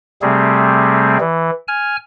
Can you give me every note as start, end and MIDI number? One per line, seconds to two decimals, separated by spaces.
0.22 1.18 48
0.22 1.18 55
0.22 1.18 57
0.22 1.18 60
0.22 1.18 68
1.21 1.51 52
1.68 1.96 80
1.68 1.96 89